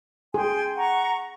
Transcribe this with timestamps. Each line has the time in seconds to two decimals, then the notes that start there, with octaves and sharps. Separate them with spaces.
0.34 G#4 G5 G#5 C6
0.76 F#5 A#5 C#6